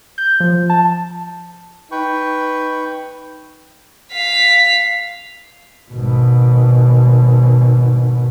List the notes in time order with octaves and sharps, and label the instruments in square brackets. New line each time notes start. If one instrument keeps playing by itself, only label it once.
[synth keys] G6
F3
A5
[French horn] D#4 [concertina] B4 G5 C#6
[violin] F5 B6
[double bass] G#1 B2